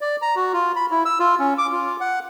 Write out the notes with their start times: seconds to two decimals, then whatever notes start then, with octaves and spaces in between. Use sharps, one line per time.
0.01 D5
0.22 A#5
0.36 F#4
0.53 F4
0.76 B5
0.91 E4
1.05 E6
1.20 F4
1.39 C#4
1.58 D6
1.72 F4
2.01 F#5